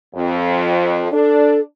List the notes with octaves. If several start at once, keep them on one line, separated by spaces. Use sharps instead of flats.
F2
D4 A4